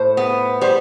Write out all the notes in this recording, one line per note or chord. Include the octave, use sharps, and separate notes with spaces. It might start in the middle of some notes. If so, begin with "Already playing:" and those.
Already playing: A2 C5
B3
G3 C5